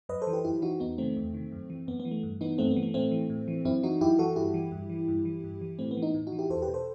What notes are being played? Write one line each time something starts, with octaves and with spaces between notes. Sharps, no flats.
F#2 B4 D#5
A4 C5
E3
G4 B4
F#2 E4 G4
E3 D#4 F#4
E2 B3 D#4
C3 D#3 A3 C4
E2
C3 D#3
F#2
E3
F#2 B3
B3
E3
A3
G2
E3 B3 D#4
G2 A3 C4
B3
E3
A3
A2 A3 C4
E3
A2
E3
F#2 C4 E4
E3 D#4 F#4
F#2 E4 G4
E3 F#4 A4
G2 E4 G4
E3
G2
E3
G2
E3
G2
E3
A2 A3 C4
B3
E3
B3 D#4
A2
D#4 F#4
E3
E4 G4
E2 A4 C5
G4 B4
B2
A4 C5